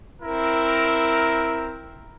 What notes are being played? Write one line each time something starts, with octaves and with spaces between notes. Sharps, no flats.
C4 E4 A#4